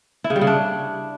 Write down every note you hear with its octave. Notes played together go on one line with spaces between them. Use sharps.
E4
C#3
G3
C#3
D4